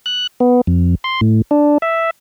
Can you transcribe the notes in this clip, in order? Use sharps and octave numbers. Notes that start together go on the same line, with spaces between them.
F#6
B3
F2
C6
A2
D4
E5